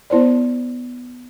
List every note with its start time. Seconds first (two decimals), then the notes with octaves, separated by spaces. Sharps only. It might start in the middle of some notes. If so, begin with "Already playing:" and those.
0.10 B3 E4 C5 D5